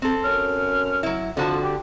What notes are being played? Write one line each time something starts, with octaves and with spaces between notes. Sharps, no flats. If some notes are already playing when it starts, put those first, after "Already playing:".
C4 A4
F#2 C#4 F6
F#3 E4
F2 D3 F3 F#4 A5
G4